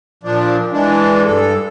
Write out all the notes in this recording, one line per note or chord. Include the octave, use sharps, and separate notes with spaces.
A#2 F3 D4
E3 G#3 D4
G2 A4